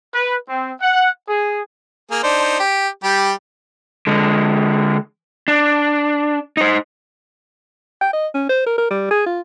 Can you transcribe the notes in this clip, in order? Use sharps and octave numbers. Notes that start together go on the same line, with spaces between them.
B4
C4
F#5
G#4
A#3 G#4
D4 D#4 C5
G4
G3 G4
D3 G#3
D4
D#4 C5
G5
D#5
C#4
C5
A#4
A#4
G3
G#4
F4